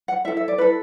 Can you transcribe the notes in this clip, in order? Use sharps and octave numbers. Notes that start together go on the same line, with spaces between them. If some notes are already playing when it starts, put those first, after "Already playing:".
F#5
E4 A4 E5
E5
D5
E4 A4 B4